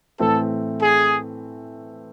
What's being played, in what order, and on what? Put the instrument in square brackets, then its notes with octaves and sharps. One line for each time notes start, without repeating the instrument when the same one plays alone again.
[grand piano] A2 E3 A3 C4 [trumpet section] A4
[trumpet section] G#4